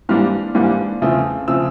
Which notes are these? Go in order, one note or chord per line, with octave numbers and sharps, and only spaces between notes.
G#2 E3 G3 A#3 D4 F6
G#2 E3 G3 A#3 D4
E2 C#3 F3 A3 C4
C#3 F3 A3 C4 E6